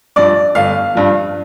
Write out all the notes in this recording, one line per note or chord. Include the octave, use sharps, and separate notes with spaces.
G2 F3 D5
G1 F5
G2 F3